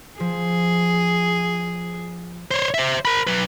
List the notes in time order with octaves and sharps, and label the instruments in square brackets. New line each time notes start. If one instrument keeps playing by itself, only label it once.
[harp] F3 [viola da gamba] G#4
[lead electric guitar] C5 C#5
C5 E5
A#4 B5
F#3 B4